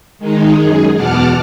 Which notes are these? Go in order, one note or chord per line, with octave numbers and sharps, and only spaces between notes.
D#3 G#3 D#4
F#2 G#4
E2 B2 F#5 A5 D6 F6